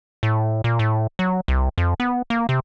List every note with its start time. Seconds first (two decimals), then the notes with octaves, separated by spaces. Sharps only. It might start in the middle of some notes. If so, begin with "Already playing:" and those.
0.23 A2
0.64 A#2
0.79 A2
1.19 F#3
1.48 C2
1.78 F2
2.00 B3
2.30 A#3
2.49 C3